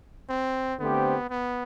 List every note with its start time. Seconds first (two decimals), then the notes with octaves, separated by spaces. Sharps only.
0.29 C4
0.79 D3 A3 B3 C4 G4 C5
1.30 B3